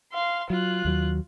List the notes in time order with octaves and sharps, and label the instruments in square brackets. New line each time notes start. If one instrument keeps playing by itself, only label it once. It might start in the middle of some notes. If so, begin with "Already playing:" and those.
[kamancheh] F5 C6
[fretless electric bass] F#3 [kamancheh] F4 F#6
[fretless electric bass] D#2 F#3